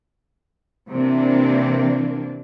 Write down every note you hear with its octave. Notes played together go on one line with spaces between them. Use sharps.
C3 E3 A#3 D4